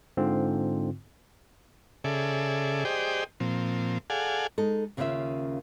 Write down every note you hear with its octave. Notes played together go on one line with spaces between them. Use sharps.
G#2 D3 C4 F4
C#3 G#4 A4 D5 E5
G4 G#4 C5 D5 D#5 G5
A#2 F3 C4
G#4 A4 D5 F5 F#5 G#5
G#3 D#4 A4
D#2 C#3 A#3 C#4 F4 E5